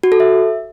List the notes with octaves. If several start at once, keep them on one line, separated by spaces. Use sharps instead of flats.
F#4
A4
E5